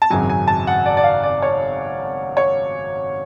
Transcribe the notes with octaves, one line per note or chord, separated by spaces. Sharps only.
A5
G#1 F#2 C#3 F#3 G#5
G#5
A5
F#5
D5
D5
F5
D5
C#5
C#5